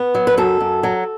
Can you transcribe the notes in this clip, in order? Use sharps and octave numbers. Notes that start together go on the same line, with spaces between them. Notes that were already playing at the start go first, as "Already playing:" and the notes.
Already playing: B3
F#3
B4
F#2 A4
F#2
F#3